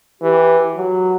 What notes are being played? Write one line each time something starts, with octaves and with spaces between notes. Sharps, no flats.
E3 G4
F#3